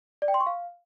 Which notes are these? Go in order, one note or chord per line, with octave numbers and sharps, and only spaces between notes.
D5
G5
C6
C#6
F5